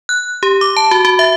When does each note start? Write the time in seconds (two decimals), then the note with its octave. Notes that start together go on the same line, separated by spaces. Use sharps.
0.09 F#6
0.43 G4
0.61 D6
0.77 A5
0.91 F#4
1.05 F#4
1.19 E5